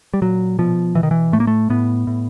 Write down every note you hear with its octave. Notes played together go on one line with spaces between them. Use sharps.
G3
A#2 F#3
B2 F3
B2 E3
D#3
E3
A2 A3
A#3
A3
A2 B3
A2